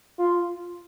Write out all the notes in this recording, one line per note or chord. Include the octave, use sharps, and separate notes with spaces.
F4